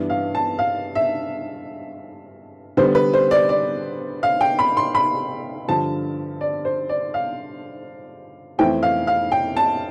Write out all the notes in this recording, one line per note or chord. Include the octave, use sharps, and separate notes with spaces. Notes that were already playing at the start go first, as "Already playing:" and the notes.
Already playing: G2 E3 B3 D4
F5
A5
F5
E5
D3 G3 B3 C5
B4
C5
D5
D5
F5
G5
B5
C6
B5
G2 D3 F3 A5
D5
C5
D5
F5
F2 E3 A3 C4 G5
F5
F5
G5
A5